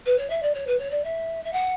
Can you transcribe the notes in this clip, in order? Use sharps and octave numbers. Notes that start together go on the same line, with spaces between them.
B4
C#5
E5
D5
C#5
B4
C#5
D5
E5
E5
F#5